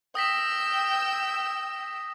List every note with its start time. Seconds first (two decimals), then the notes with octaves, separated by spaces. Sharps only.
0.15 G5 D#6 E6 A#6 B6